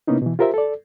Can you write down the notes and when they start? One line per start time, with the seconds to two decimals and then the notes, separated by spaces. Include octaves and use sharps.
0.07 C3 A#3 B3 C#4 D#4 E4
0.22 B2 E3
0.39 F4 G4 A#4 C5 E5
0.54 A4 D5